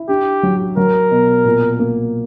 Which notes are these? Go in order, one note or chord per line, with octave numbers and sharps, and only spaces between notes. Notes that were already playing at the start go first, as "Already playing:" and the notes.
Already playing: E4
D4 G4
F#3
F#3 A#4
B2
A#2
A#3